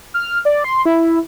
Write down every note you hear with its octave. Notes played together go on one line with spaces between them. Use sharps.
F6
D5
C6
E4